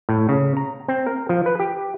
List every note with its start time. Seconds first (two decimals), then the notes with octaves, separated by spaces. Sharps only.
0.09 A2
0.29 C#3
0.57 A#5
0.88 C4
1.06 A#4
1.29 F3
1.46 B4
1.59 G4